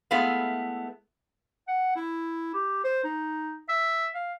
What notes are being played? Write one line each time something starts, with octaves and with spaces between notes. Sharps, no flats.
G#3 A3 B3 E4 G#4 F5
F#5
E4
G4
C5
D#4
E5
F5